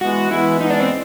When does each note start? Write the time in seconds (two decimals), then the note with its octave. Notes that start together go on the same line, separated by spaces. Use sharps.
0.01 E3 G#3 B3 F#4
0.31 E3 G#3 B3 E4
0.60 E3 G#3 B3 D#4
0.70 D4
0.80 C4